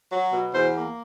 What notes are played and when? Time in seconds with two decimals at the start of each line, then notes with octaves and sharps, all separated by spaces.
0.10 F#3
0.32 B2
0.54 E2 C5
0.76 A#3